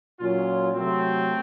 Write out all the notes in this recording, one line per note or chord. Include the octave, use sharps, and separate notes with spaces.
A#2 F#3 C#4 F4
C3 F#3 A3 C4